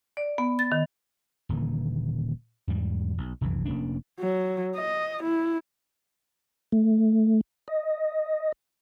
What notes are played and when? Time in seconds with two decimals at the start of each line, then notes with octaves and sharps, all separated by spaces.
0.17 D5
0.38 B3
0.59 A6
0.72 D#3
1.49 D#1 A#2 D3 E3
2.67 E2 G#2 G3
3.18 B1
3.41 F1 C2 F#2 E3
3.65 F1 A#3 C#4 D4
4.20 F#3
4.76 D#5
5.24 E4
6.72 A3
7.68 D#5